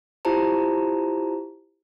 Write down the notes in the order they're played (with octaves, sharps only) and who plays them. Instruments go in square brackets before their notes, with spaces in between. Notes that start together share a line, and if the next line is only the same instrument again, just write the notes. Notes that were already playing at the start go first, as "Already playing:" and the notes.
[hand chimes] E4 F4 G4 C5 A5 A#5